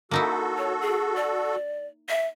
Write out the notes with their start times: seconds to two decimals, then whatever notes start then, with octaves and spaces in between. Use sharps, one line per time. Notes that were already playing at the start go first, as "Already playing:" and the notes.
0.11 A#3 D#4 E4 F#4 A4
0.58 C#5
0.81 G#4
1.16 D5
2.09 E5